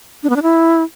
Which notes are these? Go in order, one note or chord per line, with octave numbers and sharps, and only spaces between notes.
D4
B3
D4
E4